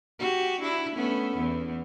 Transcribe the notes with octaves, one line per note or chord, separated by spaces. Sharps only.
F#4 G4
D4 E4
A3 B3 C#4
E2